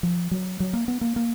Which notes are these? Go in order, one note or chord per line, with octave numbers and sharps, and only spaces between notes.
F3
F#3
F#3
A#3
B3
A#3
A#3